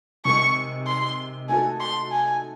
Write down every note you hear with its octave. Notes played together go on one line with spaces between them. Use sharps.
C3 D#3 G#3 C#6
C6
A3 D#4 F#4 A4 G#5
C6
G#5